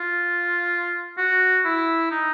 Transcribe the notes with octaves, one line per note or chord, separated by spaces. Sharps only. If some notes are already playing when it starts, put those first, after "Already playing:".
Already playing: F4
F#4
E4
D#4